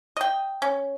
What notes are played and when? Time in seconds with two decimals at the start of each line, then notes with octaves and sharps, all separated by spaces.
0.17 D#5 G5
0.62 C#4